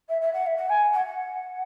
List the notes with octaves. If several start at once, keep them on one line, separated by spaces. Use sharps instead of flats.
E5
E5
F#5
E5
F#5
G#5
F#5
F#5